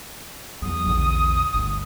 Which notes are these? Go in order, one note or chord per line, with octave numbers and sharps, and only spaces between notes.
E2 F#3 D#6
A#1 E2 D3
G1 D2 D3